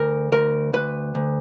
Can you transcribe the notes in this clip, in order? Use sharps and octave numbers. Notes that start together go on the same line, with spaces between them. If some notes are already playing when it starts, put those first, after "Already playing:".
Already playing: D2 A#4
D2 A#4
D2 B4
D2